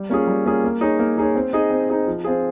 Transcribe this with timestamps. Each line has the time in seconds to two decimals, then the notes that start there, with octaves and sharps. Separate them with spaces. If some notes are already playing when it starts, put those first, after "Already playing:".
Already playing: G3
0.10 A#3 C#4 F4 G#4
0.28 G3
0.46 A#3 C#4 F4 G#4
0.64 A#3
0.81 D#4 G#4 C#5
0.99 A#3
1.18 D#4 G#4 C#5
1.36 C4
1.53 D#4 G#4 D#5
1.70 C4
1.89 D#4 G#4 D#5
2.07 F3
2.24 C4 F4 G#4